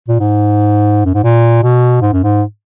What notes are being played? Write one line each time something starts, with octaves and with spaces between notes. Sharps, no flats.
A#2
G#2
F#2
G#2
A#2
B2
G#2
F#2
G#2